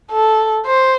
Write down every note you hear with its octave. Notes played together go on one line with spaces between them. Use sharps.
A4
C5